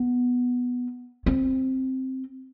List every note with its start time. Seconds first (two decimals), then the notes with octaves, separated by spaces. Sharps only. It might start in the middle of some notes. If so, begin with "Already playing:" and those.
Already playing: B3
1.26 C4